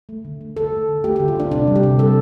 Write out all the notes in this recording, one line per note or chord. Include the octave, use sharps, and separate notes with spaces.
A3
D3
A3
D3 A4
A3
D3
A3 G4
G4
D3
F4
A3 D4
C3 D4
G3
G4
C3
G3 A4